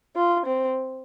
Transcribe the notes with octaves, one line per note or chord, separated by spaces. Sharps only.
F4
C4